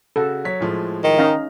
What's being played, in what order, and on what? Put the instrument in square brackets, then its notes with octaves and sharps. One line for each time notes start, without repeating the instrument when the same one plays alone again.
[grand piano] C#3 F#4 [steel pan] A4
[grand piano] F#3 C#5 B6
A2 F3 G#3
[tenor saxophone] D#3
[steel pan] C#4 D#4 F5 [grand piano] F6 A#6